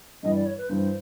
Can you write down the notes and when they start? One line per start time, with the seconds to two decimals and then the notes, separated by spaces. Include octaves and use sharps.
0.23 G2 E3 G3 D#5
0.35 D5
0.46 C#5
0.58 B4
0.69 G2 E3 G3 C5